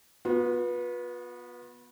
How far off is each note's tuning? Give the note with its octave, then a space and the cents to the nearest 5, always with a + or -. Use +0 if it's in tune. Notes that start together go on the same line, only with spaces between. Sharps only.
B3 -20 F4 +40